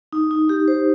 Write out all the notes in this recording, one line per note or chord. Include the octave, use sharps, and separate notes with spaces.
D#4
D#4
G4
C5